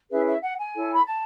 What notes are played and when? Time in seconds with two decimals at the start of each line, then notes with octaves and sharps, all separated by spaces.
0.10 C#4 E4 G#4 B4 E5
0.26 E5
0.42 F#5
0.58 G#5
0.74 E4 A4 C#5
0.93 B5
1.05 A5